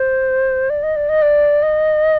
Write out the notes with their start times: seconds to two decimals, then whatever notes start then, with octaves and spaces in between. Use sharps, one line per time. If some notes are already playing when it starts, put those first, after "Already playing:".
Already playing: C5
0.70 D5
0.83 D#5
0.96 D5
1.09 D#5
1.22 D5
1.63 D#5